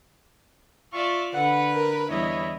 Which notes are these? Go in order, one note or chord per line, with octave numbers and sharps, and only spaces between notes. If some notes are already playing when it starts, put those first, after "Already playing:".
F4 D5 E5 C#6
D3 B4 F#5
A#4
E2 G3 E4 C#5 D#5